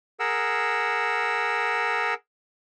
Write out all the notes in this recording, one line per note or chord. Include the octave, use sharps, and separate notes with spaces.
G#4 A#4 F#5 E6